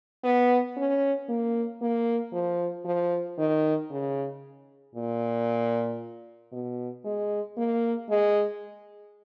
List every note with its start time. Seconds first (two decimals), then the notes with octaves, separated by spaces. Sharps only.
0.24 B3
0.77 C#4
1.29 A#3
1.81 A#3
2.33 F3
2.85 F3
3.38 D#3
3.90 C#3
4.95 A#2
6.52 B2
7.05 G#3
7.57 A#3
8.10 G#3